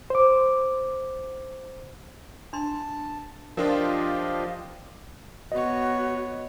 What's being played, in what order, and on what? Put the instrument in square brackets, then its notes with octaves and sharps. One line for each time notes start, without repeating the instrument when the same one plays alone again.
[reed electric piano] C5 D6
[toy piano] D4 C6 [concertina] A5
[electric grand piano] F3 D4 F4 [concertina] G4 D#5 F5 [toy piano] A#4
[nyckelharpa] B3 C#5 [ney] F#4 [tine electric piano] D#5